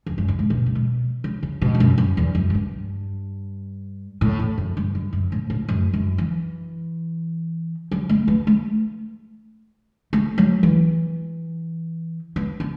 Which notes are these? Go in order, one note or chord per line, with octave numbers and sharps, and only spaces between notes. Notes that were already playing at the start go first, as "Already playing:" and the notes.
E2
F#2
G2
A2
B2
A2
B2
C#3
C#3
B2
E2
F#2
F#2
E2
F#2
A2
G2
A2
E2
F#2
G2
F#2
F#2
A2
A2
F#2
F#2
E3
F#3
A3
B3
A3
A3
F#3
E3
B3
B3